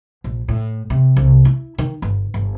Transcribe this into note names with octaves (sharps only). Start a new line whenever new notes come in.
A#1
A2
C3
C2
E4
D#3
G1
G1